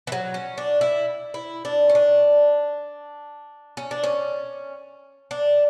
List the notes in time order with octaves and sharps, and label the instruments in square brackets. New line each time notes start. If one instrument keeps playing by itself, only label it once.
[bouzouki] E3
F#3
C#4
D4
E4
E4
D4
C#4
D4
C#4
D4
C#4
D4